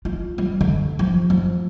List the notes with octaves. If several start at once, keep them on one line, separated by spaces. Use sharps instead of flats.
F4
G3
D3
F3
F3